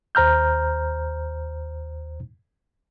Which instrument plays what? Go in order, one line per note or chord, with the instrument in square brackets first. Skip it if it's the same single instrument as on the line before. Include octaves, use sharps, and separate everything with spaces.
[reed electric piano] D#2 C5 A#5 F6 G6